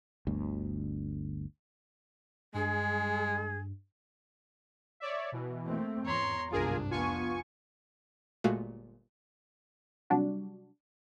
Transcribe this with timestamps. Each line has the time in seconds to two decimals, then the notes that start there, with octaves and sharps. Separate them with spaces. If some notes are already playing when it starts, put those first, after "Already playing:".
0.27 G1 D2
2.54 G2 G#3 G#4
5.00 C#5 D5 E5
5.32 B2 E3
5.67 A3 A#3 C4
6.06 E2 G#2 C#5 A#5 C6
6.51 G1 C2 G#2 D4 F4 G#4 A#4
6.91 F1 B3 F4 G#5 C#6
8.44 G1 A#2 G#3 A3 F#4 F5
10.10 C3 F#3 G3 D4 F#4